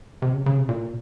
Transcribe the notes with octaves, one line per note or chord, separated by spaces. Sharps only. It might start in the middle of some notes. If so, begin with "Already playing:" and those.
C3
C#3
C#3
C3
A#2